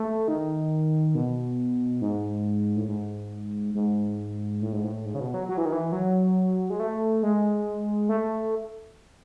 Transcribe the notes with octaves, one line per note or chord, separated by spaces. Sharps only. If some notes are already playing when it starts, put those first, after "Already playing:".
Already playing: A3
D#3
B2
G#2
A2
G#2
G#2
A2
G#2
A2
G#2
C#3
B2
F#3
F#3
E3
D#3
E3
F#3
G#3
A3
G#3
A3